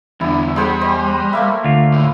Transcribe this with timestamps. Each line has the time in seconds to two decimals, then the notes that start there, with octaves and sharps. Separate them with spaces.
0.21 E2 G2 D3 E4
0.56 G3 G#4 C5 F#5
0.81 C5 D#5
1.33 A3 A#3 E5
1.64 D2 F4
1.93 A2